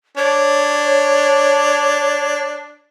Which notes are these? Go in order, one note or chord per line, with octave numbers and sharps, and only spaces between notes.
D4 C#5